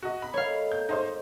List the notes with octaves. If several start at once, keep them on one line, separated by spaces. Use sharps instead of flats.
F#4 D#5
D#4 D#5 B5
D#3 A3 C#5 F5
G6
G#2 D#4 C5 C6